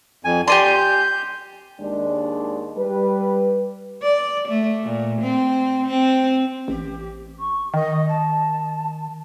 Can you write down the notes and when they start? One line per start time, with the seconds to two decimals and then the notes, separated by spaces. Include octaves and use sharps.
0.25 F2 G#5
0.48 G4 D5 G#5 C6
0.64 G6
1.80 D#2 G#3 D4
2.77 G3 B4
4.02 D5
4.48 A3
4.83 A#2
5.21 C4
5.87 C4
6.68 A1 G4
7.39 C#6
7.74 D#3 D#5
8.08 A5